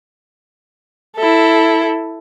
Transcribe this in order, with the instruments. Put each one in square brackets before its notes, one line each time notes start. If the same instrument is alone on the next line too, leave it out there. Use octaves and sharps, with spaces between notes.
[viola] E4 A4